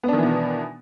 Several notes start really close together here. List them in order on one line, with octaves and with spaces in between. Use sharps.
B3 D4 D#3 E3 B2